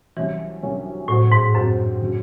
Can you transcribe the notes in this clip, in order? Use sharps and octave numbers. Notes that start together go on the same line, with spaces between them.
C2 C3 E3 F#3 C#4 F#4
C2 C3 F#3 C#4 F#4
A2 C3 F#3 C4 F#4 C5
G#2
F#2 C3 F#3 C4 F#4 C5
C#3 F#3